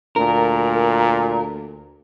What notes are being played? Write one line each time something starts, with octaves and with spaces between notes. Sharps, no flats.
D2 A#2 A#4